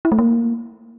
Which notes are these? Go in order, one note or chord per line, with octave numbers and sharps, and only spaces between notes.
E4
A3
A#3